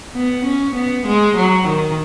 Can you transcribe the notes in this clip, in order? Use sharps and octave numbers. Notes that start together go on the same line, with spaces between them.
B3
C#4
B3
G#3
F#3
D#3